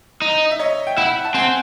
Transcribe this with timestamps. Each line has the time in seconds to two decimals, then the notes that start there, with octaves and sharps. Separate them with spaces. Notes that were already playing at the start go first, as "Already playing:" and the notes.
0.22 D#4
0.51 E5
0.59 C#5 D#5
0.87 G5
0.97 E4 E5 F#5
1.25 A5
1.34 C4 F#5 G#5